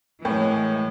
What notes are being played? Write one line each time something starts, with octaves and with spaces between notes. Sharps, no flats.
A2 E3 G#3 A#4 C#5